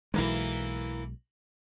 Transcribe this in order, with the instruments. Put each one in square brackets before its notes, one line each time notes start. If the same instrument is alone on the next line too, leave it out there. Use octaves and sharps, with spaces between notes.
[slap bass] B1 G#3 [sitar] E3 A#3 E4